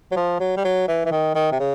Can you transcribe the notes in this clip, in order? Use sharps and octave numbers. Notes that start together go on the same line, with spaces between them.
F#3
F3
F#3
G3
F#3
E3
E3
D#3
D#3
C3
C#3